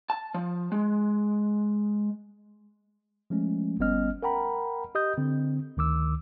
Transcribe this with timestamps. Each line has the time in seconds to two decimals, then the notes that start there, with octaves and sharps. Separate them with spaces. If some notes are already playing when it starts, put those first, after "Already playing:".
0.10 A5
0.34 F3
0.72 G#3
3.30 F3 G#3 A3 C#4
3.80 G1 G3 B3 C#4 D#5 F6
4.23 A#4 F#5 G5 A#5 B5
4.95 G4 D#5 D#6 G6
5.17 D3 C4
5.77 D2 D#3 D6 E6